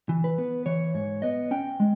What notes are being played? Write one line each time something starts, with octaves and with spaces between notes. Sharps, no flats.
E3
B4
B3
E3 C#5
G#2 C#5
B3 D#5
C#4 G5
G#3